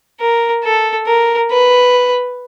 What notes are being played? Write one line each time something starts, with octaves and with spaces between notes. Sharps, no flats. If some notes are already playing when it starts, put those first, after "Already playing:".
A#4
A4
A#4
B4